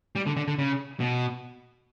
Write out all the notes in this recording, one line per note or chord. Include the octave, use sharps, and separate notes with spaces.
G3
D3
D3
D3
C#3
B2